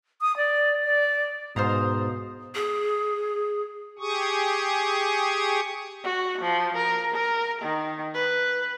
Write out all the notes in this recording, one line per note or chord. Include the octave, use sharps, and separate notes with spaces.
D#6
D5
D5
G#2 B2 C5 F5 A#5 D#6
G#4
G4 G#4 C#6 D#6
F#4
F3
A#4
A#4
D#3
B4